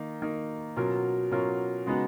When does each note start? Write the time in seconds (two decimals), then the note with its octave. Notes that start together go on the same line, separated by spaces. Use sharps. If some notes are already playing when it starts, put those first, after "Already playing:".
Already playing: D#3 A#3 D#4
0.22 D#3 A#3 D#4
0.77 B2 F#3 C#4 F4 A#4
1.31 B2 F#3 C#4 F4 A#4
1.86 C#3 G#3 B3 D#4 F#4